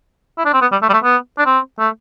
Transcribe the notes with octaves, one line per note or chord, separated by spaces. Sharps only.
E4
D4
C4
B3
G3
A3
G3
A3
B3
D4
C4
A3